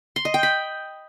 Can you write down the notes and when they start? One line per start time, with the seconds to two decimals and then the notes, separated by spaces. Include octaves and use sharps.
0.16 C6
0.25 D#5
0.34 G5
0.43 B5